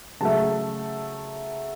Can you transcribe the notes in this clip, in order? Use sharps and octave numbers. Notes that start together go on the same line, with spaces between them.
C#3 F#3 A3 A5